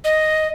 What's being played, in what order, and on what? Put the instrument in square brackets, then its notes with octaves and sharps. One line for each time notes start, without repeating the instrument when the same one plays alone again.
[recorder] D#5